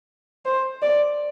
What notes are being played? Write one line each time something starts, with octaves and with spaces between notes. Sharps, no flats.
C5
D5